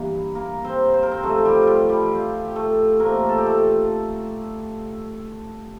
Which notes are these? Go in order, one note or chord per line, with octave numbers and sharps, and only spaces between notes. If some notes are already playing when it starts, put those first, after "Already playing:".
Already playing: G2 E3 A#3
A#3 A#4
C4 C5
C5
A#4
C4 C5
C3 F3 A3 C4 A4
G3 G4
G3 F4 G4
G3 G4
F4
G4
A3 A4
A#2 A3 A#3 C4 A#4
A4
G4
A3 A4